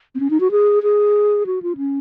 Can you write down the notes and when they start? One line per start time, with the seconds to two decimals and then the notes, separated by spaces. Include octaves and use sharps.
0.15 C4
0.20 C#4
0.30 D#4
0.40 F#4
0.51 G#4
0.83 G#4
1.46 F#4
1.62 F4
1.77 C#4